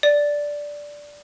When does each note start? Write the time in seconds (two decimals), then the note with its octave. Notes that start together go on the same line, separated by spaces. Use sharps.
0.03 D5